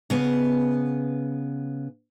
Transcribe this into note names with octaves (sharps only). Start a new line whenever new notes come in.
C#3 B3